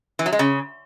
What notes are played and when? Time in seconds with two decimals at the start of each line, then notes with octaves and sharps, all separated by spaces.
0.19 E3
0.26 F#3
0.33 G#3
0.39 C#3